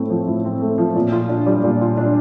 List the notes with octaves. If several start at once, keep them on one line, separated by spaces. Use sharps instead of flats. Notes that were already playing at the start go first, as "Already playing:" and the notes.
Already playing: A2 A3 C4
F3
A2
C4
A3
F3
A#2
F4
D4
G3
A#2
F4
D4